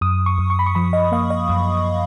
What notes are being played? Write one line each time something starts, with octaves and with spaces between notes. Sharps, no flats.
F#2 D#6
C#6
F#2
C#6
B5
C#6
F3 B5
D#5
A#3 F5
D#5
F#2